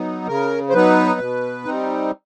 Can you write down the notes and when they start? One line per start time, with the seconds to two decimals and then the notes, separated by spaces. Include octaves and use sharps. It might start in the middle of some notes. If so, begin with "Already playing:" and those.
Already playing: F#3 B3 D#4
0.28 C#3 A#4
0.69 C5
0.74 F#3 B3 D#4 B4
1.19 B2
1.65 G3 C4 D#4